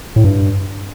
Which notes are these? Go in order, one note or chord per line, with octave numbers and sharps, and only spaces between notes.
A2
G2